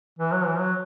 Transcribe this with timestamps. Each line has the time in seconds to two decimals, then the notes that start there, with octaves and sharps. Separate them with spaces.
0.19 E3
0.32 F#3
0.45 E3
0.59 F#3